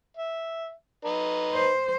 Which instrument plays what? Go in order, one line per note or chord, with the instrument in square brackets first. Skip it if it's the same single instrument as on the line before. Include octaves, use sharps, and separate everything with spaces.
[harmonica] E5
D#4 B4
[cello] C5